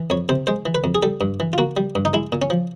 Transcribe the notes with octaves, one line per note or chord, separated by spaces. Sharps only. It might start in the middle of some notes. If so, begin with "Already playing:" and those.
Already playing: E3
F2 C#5
C3 C5
G#3 C5
E3
B4
F2
G#4
G3 A4
G2
E3
F4
A#3 F#4
G3
G2
D#4
G#3 E4
A#2
C#4
F3